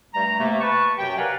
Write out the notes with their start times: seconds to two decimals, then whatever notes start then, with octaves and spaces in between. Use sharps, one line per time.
0.14 G2 G3 A3 A#5
0.39 C3 A3 A#3
0.61 B4 A5 C#6
0.98 F#2 C3 F#3 G4 G5
1.18 A#4 B4 D5 F5 F#5 G#5